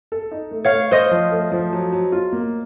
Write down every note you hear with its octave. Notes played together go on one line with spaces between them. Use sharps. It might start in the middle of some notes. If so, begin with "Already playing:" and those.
A4
D#4
A3
C#5 F5
A3
A4 C5 D#5
F3
A3
F3
F#3
F#3
F4
A#3